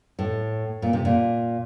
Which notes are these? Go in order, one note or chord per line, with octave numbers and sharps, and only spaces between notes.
A2
A#2
C3
A#2